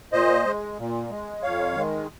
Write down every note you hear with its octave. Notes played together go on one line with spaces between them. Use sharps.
A#2 C5 D#5
G#3
A#2
G#3
F2 C#5 F5
D#3 G#3